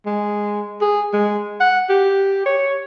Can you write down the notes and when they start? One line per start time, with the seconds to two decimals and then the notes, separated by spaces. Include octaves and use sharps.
0.06 G#3
0.81 G#4
1.13 G#3
1.60 F#5
1.89 G4
2.46 C#5